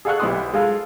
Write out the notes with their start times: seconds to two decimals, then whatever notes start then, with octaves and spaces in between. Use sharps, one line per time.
0.05 G#4 A4 F5 F#5 C#6 F#6
0.20 B1 B3 E4 G4 C6 D#6
0.53 G#3 F4 A4